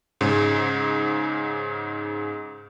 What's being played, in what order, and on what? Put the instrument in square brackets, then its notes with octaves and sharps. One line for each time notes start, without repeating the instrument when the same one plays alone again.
[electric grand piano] G#2 C#3